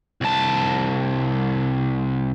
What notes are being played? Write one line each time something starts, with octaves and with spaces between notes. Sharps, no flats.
C2 A5